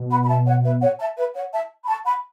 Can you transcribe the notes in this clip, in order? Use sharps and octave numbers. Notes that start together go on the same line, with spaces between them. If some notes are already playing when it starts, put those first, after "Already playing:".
Already playing: B2
F#5 B5
B5
E5 A5
C#5 F#5
B4 E5
C#5 F#5
E5 A5
B4 E5
C#5 F#5
E5 A5
B5
A5 C#6
F#5 B5